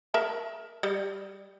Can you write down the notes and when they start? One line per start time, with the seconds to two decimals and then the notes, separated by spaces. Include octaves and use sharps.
0.14 A#4 E5 A5
0.83 G3